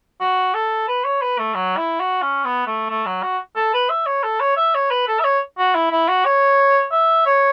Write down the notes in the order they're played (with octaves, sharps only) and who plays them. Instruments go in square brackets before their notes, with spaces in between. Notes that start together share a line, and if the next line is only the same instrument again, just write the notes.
[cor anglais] F#4
A4
B4
C#5
B4
A3
F#3
E4
F#4
C#4
B3
A3
A3
F#3
F#4
A4
B4
E5
C#5
A4
C#5
E5
C#5
B4
A4
E5
C#5
F#4
E4
E4
F#4
C#5
E5
C#5